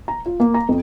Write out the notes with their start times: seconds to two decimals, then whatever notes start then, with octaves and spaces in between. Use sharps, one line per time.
0.08 A#5
0.26 F4
0.40 A#3
0.54 A#5
0.69 F2